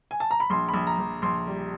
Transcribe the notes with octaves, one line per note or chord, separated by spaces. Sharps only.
G#5
A5
A#5
B5
A#1 C6
A#1 B5
A#5
A#1
A#1 C6
G3